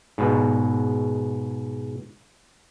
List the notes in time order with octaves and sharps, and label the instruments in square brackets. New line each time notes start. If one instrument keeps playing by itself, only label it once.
[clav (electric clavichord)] G#2 B2